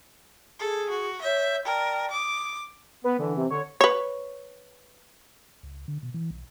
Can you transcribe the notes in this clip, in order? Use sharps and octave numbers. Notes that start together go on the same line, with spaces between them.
G#4 A4
F#4
C#5 E5 G6
A#4 D5 G5 A5
D6 D#6
B3 B4
D3 E3
C3
D3 C#5
B4 C#5
C#2
D3
B2
E3
B1